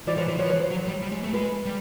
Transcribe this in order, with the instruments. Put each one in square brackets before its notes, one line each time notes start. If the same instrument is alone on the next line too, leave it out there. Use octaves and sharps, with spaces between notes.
[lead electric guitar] E3 [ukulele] C5 D5
[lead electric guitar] F3 [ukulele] B4 C#5
[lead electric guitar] E3 [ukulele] C5
[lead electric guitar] F3 [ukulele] B4 C#5
[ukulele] B4 C#5
C5
[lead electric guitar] F#3
G3
G3
G#3
A3
[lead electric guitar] G#3 [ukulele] B4
[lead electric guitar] G3